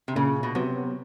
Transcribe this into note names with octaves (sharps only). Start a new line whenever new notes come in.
C3
A#2 C#3
B2
C3 F#3 B3